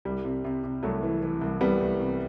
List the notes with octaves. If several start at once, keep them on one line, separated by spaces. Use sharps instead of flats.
C2 G3
C3
C3
C3
C2 F#3 A3
E3
E3
C2
C2 G3 B3
C2
C3